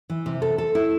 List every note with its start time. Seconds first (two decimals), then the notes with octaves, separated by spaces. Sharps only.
0.10 E3
0.26 C3
0.42 A4
0.58 A4
0.75 E4